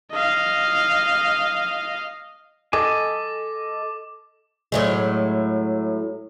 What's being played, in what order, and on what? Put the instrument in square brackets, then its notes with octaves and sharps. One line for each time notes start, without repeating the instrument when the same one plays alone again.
[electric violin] D#5 F5
[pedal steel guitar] A4 D#5 G#5 [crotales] D6
[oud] A2 F#3 G#3